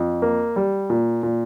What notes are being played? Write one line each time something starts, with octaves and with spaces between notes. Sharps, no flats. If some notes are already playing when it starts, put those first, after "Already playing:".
Already playing: F2
A#3
G3
A#2
A#2